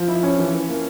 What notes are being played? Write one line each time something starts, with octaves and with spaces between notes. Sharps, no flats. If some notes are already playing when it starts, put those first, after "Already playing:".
Already playing: F3
E4
C#4
E3
E3
A#3